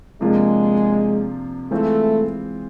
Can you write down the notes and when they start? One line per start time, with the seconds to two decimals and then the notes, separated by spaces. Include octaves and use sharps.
0.21 C3 F3 G#3 A#3 D4 F4
1.71 E3 G#3 A3 C4 F4